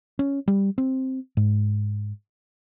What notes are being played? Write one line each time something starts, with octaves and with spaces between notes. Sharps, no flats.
C#4
G3
C4
G#2